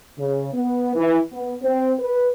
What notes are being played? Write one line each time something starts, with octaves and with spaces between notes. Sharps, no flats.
C#3
B3
E3
B3
C4
B4